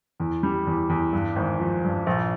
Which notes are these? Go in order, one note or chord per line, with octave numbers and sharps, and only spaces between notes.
E2
G3
E2
E2
G2
G#1
F3
G2
A#1